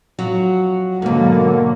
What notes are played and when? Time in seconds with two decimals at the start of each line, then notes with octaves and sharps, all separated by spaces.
0.19 F2 F#3 F#4
1.02 G#2 B2 D3 F#3 A#3